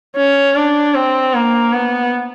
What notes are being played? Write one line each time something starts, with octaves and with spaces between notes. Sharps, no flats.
C#4
D4
C4
A#3
B3